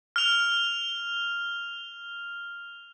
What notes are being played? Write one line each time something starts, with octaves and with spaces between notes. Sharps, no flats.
F6 F7